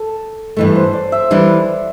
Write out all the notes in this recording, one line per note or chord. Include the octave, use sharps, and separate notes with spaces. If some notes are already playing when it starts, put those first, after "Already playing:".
Already playing: A4
G2 E3 A3
C5
D5
E5
E3 G3 D4